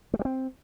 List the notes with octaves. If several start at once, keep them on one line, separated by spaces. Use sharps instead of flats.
A3
G3
C4